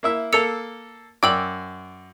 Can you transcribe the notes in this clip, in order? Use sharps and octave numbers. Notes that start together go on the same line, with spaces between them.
A#3 E4 E5
A#3 A4 E6 C#7 F7
F#2 D5 G5 E6 F#7